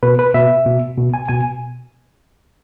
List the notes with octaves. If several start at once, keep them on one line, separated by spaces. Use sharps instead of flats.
B2 B4
B4
B2 E5
B2
B2
G#5
B2 G#5